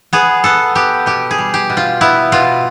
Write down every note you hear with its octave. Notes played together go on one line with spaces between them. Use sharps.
B3 G#4
B3 A4
B3 G4
B2 G4
G#4
G3
G4
B2
F4
B3 E4
B2 F4